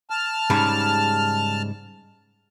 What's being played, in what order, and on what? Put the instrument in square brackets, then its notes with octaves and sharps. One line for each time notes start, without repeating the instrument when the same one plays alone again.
[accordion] A5 F6
[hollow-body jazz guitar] G#2 C#3 G3